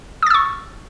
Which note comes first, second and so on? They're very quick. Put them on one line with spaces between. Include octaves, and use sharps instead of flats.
D#6 A6 E6 C#6